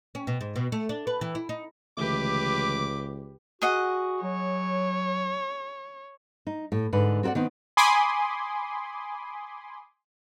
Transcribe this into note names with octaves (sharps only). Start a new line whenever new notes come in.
C#4
B2
G#2
B2
A3
D4
B4
E3
E4
D#4
C#2 D3 E3 A3 G4 B4 D6
F#4 G#4 D#5 F#5
F#3 C#5
D#4
A2
G#2 D3 B4
C4 F#4 A4 D5 F#5
D#3 B3 C4
G#5 B5 C6 D6 D#6